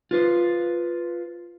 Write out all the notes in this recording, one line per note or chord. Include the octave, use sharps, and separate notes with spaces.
F4 B4 C5